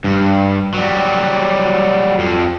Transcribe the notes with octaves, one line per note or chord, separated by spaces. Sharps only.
G2
F#3 G3
F2